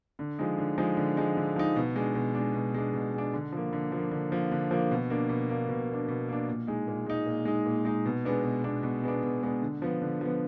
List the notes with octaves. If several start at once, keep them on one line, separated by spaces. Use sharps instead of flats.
D3
F3 G#3 D#4
D3
F3 G#3 D#4
D3
F3 G#3 D#4
D3
F3 G#3 D#4
B2
G#3 D4
B2
G#3 D4
B2
G#3 D4
B2
G#3 D4
D3
F3 A#3
D3
F3
A#3
D3
F3 A#3
D3
F3 A#3
B2
A#3 D4
B2
A#3 D4
B2
A#3 D4
B2
A#3 D4
A#2
G#3 D#4
A#2
G#3 D#4
A#2
G#3 D#4
A#2
G#3 D#4
B2
G#3 B3 D4
B2
G#3 B3 D4
B2
G#3 B3 D4
B2
G#3 B3 D4
D3
F3 B3
D3
F3 B3